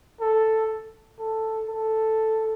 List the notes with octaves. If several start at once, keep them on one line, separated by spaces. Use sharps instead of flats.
A4
A4
A4